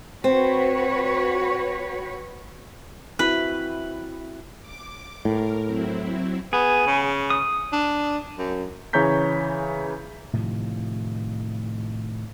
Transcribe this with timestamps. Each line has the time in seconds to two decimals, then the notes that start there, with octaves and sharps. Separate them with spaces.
0.24 C4 F#4 B4 C#5
3.19 C4 E4 F#4 B4
4.61 D6
5.25 A2 A#4
5.66 F#3 C4 E4
6.53 B3 G#4
6.87 C#3
7.30 D#6
7.73 D4
8.38 F#2
8.93 C#3 E3 C#5 A#5 G6 B6
10.33 A2 C3 D#3 F3